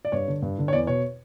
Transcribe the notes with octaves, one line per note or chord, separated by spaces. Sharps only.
D5
G2 C#5
D3
G2
D3
C#5
E2 D5
B2 C#5